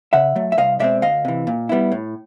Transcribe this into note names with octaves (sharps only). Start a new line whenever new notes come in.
C#3 E5 F#5
F#3 A3
E5
C2 D#5 F5
B2 G#3 C4 D5 E5
D2 D#5 F5
C3 E3
A#2
G3 B3 E4
A2